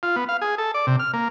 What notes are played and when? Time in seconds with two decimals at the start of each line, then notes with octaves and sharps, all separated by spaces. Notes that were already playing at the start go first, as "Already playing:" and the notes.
0.03 F4
0.16 B3
0.29 F5
0.42 G#4
0.58 A4
0.74 D5
0.87 C3
0.99 F6
1.13 A#3